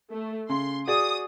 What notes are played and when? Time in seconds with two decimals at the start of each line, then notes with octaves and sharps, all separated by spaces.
0.11 A3
0.49 C#3 C6
0.87 F#4 G#4 D5 D#6